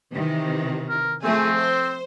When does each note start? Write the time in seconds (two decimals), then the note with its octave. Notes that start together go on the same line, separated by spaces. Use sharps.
0.13 C3 D#3 E3
0.89 A#4
1.23 F3 A3 C4 G#4
1.58 C5